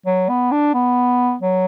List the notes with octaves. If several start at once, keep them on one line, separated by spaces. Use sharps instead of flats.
F#3
B3
D4
B3
F#3